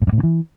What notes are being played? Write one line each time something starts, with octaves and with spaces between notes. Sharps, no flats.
A2
F#2
A2
C#3
E3